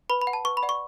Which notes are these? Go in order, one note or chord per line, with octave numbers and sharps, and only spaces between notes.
B4 B5
B5
F#5
A5
B4 C#6
B5
D5 F#5
C#6